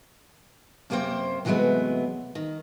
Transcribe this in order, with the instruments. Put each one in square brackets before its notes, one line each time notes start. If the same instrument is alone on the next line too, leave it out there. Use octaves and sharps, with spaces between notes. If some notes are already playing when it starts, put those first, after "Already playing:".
[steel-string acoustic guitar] F#2 C3 A#3 F4 C5 G5
C3 E3 F#3 G#3 A3 B3
D#3